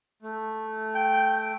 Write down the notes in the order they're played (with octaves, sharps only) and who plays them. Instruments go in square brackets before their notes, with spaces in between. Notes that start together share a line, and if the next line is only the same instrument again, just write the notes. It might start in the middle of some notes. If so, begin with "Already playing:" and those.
[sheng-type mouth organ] A3
[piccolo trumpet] G5